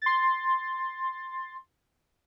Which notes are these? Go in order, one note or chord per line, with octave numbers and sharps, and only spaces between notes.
C6 A6